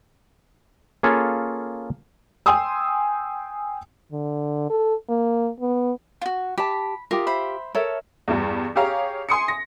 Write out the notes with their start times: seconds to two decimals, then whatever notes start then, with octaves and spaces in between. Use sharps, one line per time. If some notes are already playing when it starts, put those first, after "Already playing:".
1.03 A#3 C#4 F4 G#4 A4 C#5
2.46 G5 G#5 C6 D#6 E6
4.12 D3
4.70 A4
5.09 A#3
5.60 B3
6.21 F4 F#4
6.58 G4 A5 B5
7.11 F4 G4 A#4 D#6
7.27 C5 E5 B5
7.75 A4 A#4 C#5 E5
8.28 E2 G2
8.76 G4 G#4 C#5 F5 A#5
9.29 G#5 C6 D#6 C#7
9.48 A#6